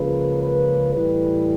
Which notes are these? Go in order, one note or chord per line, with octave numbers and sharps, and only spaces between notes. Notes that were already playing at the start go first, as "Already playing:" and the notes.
Already playing: C#2 C#3 F3 A#3 B4
B4
A2 E3 G3 B4